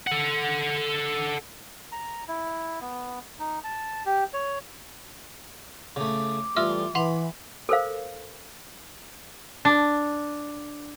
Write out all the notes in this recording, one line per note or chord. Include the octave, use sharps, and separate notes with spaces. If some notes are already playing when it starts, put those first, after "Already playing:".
A4 F#5
A#5
E4
B3
D#4
A5
G4
C#5
C#3 A3 D6
E3 G3 A3 F4 E5 E6 F6
E3 F#5 B5 C6 F7
A4 A#4 C5 F5
D4